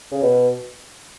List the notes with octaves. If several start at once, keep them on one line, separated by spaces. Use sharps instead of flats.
C#3
B2